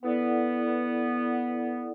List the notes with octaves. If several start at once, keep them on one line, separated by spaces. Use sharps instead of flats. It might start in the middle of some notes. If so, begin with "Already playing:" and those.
B3 E4 A4 D5 F#5